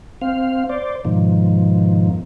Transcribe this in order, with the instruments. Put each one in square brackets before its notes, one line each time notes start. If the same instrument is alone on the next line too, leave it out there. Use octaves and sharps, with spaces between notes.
[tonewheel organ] C4 F5
C5 D5
G#2 B2 D#3 F3